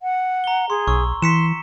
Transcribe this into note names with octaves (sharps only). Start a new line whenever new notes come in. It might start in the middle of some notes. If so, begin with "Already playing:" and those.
F#5
A#5 G7
G#4 C6
B1 C#6 E6
E3 C6 B6 C#7 E7